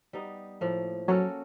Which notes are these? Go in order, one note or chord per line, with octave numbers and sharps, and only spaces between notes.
G3 B3 D#4
A2 F3 A#3
F#3 A#3 C#4 F#4 A4